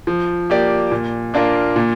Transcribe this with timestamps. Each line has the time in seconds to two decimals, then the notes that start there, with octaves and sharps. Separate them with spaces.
0.07 F3
0.50 A#3 G4 D5
0.91 A#2
1.34 A#3 D4 F4 A#4
1.76 A#2